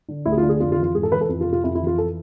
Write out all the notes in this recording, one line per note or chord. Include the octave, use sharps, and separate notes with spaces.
D3
D2 E4
G#4
F4
D3
G#4
F2 F4
F4
E3
F4
G#2 G#4
A4
E3 B4
A4
F2
F4
C3
F4
F2 E4
E4
E3
F4
A4